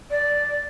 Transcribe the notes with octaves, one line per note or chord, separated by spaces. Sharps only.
D5